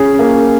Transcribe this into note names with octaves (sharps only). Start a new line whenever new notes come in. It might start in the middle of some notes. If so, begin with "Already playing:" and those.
Already playing: C#4 G#4
A#3